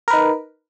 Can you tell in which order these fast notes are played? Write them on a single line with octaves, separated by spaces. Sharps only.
A#4 B4 D#4